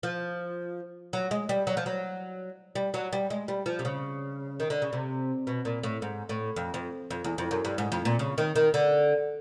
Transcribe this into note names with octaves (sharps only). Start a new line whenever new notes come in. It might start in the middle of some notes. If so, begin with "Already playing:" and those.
F3
F#3
G#3
G3
F#3
F3
F#3
G3
F#3
G3
G#3
G3
F3
C3
C#3
D#3
D3
C#3
C3
B2
A#2
A2
G#2
A2
F2
F2
F2
E2
F2
F#2
G2
G#2
F2
A#2
C#3
D#3
D#3
D3